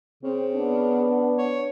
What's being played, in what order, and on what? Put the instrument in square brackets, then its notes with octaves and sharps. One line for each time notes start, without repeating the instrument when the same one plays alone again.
[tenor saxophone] C#3 [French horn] C4
[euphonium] B3 [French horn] D4
[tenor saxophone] C#5